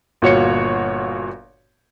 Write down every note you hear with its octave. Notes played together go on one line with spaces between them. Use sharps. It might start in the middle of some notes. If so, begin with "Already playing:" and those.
G1 A#2 F#4 C#5 F5 C#7